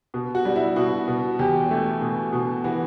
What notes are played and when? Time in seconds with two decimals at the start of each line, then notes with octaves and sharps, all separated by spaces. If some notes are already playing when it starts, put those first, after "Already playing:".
0.14 B2
0.35 F#4
0.45 G3
0.56 E4
0.76 B2 F#4
1.08 B2
1.39 E2 G4
1.70 A3
2.01 B2
2.33 B2
2.64 E3 F#4